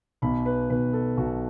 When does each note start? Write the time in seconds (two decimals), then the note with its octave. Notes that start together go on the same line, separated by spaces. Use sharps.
0.22 B1 B2 B5
0.46 B4
0.70 B1 B2 B4
0.93 A4
1.17 B1 B2 F#4